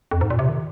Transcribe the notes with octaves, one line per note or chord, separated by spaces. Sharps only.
F2
G#2
A#2
C3
D#3